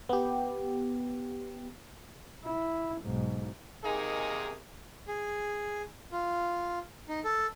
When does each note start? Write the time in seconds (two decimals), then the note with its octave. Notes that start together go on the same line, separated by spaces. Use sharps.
0.09 B3 G4
2.44 E4
3.02 B1 G#2
3.83 C3 D#3 A#3 D#4 G#4
5.08 G#4
6.12 F4
7.09 D#4
7.25 A4